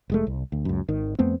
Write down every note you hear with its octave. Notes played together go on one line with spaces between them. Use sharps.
F1 G#3 A3
C2
D2
C#2 F#2
G#1 D#3
F2 A3 B3 C4